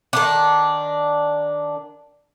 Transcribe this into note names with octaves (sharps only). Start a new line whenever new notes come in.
D#3 D4